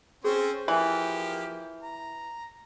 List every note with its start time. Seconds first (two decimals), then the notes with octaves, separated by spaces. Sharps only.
0.24 C4 C#4 G#4 C5
0.68 E3 F3 A#3 G4
1.83 A#5